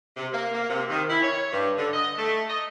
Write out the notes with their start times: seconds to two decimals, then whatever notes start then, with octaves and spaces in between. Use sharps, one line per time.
0.17 C3
0.32 A#3
0.53 A#3
0.69 C3
0.90 D#3
1.10 E4
1.23 C#5
1.53 G2
1.77 D3
1.94 D#5
2.18 A3
2.50 D#5